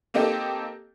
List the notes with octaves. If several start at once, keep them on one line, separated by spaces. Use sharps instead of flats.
A#3 C4 D#4 G4 A4